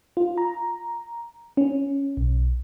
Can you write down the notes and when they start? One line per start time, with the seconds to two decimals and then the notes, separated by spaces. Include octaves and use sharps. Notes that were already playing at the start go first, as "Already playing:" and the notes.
0.17 F4
0.38 A#5
1.57 C#4
2.17 B1